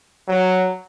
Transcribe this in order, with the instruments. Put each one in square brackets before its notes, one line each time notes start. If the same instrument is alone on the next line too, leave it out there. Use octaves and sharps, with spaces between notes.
[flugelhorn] F#3